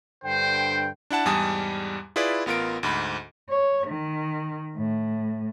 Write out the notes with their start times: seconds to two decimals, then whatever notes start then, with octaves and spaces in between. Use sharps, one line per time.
0.24 G2 D3 C5 G5
1.10 D4 E4 F#5 A5
1.25 E2 G#2 G3 G#5 A5 D#6
2.16 E4 F4 G#4 B4 D5
2.46 A1 B3 F4 A#4 D7
2.83 D2 G#2 B5
3.49 C#5
3.88 D#3
4.76 A2